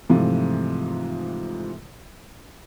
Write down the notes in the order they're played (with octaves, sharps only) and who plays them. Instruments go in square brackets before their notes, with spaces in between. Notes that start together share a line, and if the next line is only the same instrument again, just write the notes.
[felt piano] G#2 C3 E3 F3 A3